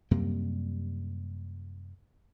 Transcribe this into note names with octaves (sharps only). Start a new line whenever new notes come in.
F#2 C3 G3 A#3